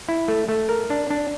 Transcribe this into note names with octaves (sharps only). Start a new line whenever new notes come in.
E4
A3
A3
A#4
D4
D4